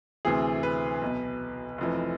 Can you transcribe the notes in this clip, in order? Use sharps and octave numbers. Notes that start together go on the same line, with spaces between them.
D2 C3 E3 G#4
B4
B1 B2
F1 F2 E3